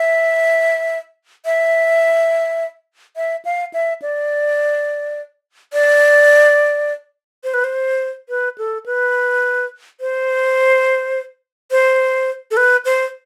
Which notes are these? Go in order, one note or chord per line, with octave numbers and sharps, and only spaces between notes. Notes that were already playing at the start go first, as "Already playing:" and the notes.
Already playing: E5
E5
E5
F5
E5
D5
D5
C5
B4
C5
B4
A4
B4
C5
C5
A4
B4
C5